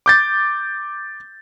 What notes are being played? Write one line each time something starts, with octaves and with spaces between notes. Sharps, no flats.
D6 G6 A6